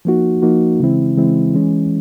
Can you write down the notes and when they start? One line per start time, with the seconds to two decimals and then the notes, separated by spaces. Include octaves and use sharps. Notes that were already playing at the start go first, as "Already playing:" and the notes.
0.05 F3 A#3 D#4 F#4
0.42 F3 A#3 D#4 F#4
0.80 C#3 E3 G#3 C4 E4
1.17 C#3 E3 G#3 C4 E4
1.54 E3 G#3 C#4